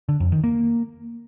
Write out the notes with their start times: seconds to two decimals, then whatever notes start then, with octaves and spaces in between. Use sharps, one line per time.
0.09 D3
0.20 F2
0.32 D#3
0.44 A#3